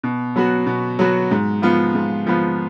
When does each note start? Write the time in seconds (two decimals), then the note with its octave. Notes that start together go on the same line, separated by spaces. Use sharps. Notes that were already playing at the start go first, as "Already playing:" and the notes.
0.04 B2
0.36 F#3 B3 F#4
0.66 B2
0.99 F#3 B3 F#4
1.31 G#2
1.62 F3 B3 F4
1.95 G#2
2.27 F3 B3 F4